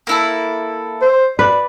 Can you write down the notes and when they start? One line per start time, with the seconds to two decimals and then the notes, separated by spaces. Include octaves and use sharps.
0.07 A#3 E4 A4
1.02 C5
1.39 B4 D5